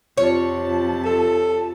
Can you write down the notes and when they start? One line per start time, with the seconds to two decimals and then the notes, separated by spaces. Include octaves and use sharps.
0.17 F2 C3 F4 C#5 A5
1.05 A4